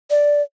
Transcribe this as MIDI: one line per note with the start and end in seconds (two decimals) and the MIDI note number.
0.10 0.42 74